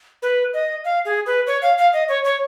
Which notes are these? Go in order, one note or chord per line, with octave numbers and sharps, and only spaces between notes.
B4
D#5
F5
G#4
B4
C#5
F5
F5
D#5
C#5
C#5